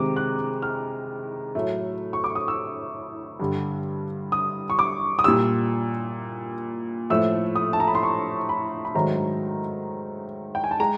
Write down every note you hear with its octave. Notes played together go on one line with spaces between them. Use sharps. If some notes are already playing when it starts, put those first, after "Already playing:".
Already playing: C3 D#3 G#3 D6
F#6
F6
A2 F#3 A3
C#6
D6
D#6
E6
G2 D3 G3
D#6
C#6
D6
D#6
A#2 G3 E6
A2 F3 A3 E6
D#6
A5
A#5
B5
C6
C#6
B5
B5
G#2 D#3 F#3 A3 A#5
G5
G#5
A5
G#3 A#5